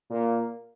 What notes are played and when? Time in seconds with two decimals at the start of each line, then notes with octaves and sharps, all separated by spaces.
0.10 A#2 A#3